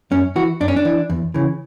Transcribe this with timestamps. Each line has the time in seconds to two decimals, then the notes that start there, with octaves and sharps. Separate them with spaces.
0.11 F#2 C#4
0.36 E3 F#4
0.60 F#2 D4
0.68 C#4
0.76 D4
0.85 E3
1.10 E2
1.34 C#3 E3